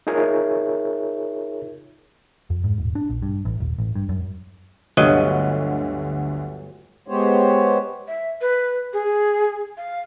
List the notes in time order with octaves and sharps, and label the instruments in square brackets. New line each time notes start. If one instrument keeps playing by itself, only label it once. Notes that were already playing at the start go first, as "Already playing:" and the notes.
[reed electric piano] D#4 F4 G#4 A#4 C#5 E5
[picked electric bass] F2
G#2
D#1
D4
A#1
G2
A1
D#1
A1
G2
F#2
[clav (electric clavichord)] G1 F#3 D#5 [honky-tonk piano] D2 D3
[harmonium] G#3 B3 G4 C5 C#5
[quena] E5
B4
G#4
F5